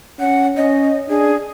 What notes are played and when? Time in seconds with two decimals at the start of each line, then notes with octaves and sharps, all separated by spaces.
0.20 C#4 F#5
0.57 C#4 D#5
1.09 D4 G#4